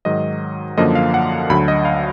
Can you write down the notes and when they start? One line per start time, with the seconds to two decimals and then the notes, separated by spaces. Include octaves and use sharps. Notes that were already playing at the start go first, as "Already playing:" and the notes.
0.05 G#2 D#3 F#3 D#5
0.78 F#2 D3 F3 A#3 D#5
0.95 F5
1.14 F#5
1.50 D2 D3 F#3 B5
1.68 D#5
1.85 F5